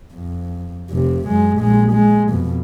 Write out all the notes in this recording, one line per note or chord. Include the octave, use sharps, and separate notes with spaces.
F2
F1 C3
F#2 G#3
A#1 G#3
G#3
F2 B2